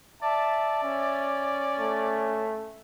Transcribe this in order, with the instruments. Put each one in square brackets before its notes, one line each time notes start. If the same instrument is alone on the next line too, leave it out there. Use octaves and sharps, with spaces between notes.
[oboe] D5 [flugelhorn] E5 [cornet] A5
[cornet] C#4
[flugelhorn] A3